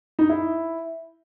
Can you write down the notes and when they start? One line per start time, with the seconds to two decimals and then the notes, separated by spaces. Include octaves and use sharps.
0.19 D#4
0.30 E4